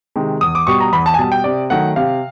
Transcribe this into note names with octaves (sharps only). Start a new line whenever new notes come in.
C3 D#3 G#3
E2 D#6
D6
B2 G3 C#6
A#5
E2 B5
A5
G#5
B2 G3 A5
G5
C3 D5
D#3 F#3 A3 F#5
C3 F5